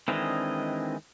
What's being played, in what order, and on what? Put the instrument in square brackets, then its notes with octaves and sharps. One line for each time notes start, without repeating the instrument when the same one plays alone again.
[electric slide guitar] D#3 E3 G#3 [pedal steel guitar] C4 D4 D#5